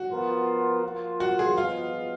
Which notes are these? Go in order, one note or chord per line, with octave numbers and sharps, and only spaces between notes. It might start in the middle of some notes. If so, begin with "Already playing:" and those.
Already playing: F#4
F3 B3 F4 A#4
F3 A#3 F4
F#4
G#4
F3 G#3 B3 F4